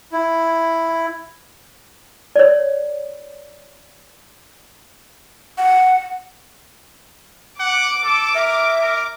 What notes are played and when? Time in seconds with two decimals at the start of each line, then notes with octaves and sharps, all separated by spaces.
0.12 E4
2.36 C#5 D5
5.58 F#5
7.60 F#5 D6
8.04 A4
8.35 A#4 E5
8.82 A#4